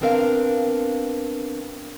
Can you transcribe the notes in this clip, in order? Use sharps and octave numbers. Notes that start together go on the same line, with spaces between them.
B3 C4 D4 A#4 D5 F5